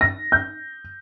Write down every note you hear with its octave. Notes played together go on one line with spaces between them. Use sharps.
A#6
G6